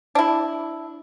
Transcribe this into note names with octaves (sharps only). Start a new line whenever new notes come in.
D4 E4